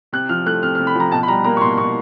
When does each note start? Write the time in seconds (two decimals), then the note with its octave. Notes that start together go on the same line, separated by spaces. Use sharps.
0.13 C3 F#6
0.29 F3 F6
0.46 A3 F#6
0.63 C3 F6
0.75 F6
0.79 C3
0.87 B5
0.95 F3
1.00 A#5
1.12 B2 A5
1.23 B5
1.28 G3 A#5
1.44 A#3 A#5
1.57 C#6
1.61 B2 C6
1.78 B2 C#6